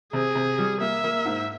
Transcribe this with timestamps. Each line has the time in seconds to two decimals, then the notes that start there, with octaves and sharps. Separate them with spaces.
0.13 C3 G#4
0.35 C3
0.58 G3
0.80 A#3 E5
1.04 A#3
1.25 G#2